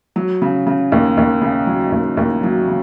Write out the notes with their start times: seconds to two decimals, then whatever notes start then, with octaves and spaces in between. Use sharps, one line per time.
0.16 F#3
0.42 C#3
0.67 C#3
0.92 D#2
1.17 D#2
1.41 C#3
1.67 F#3
1.92 D#2
2.17 D#2
2.43 F#3
2.68 C#3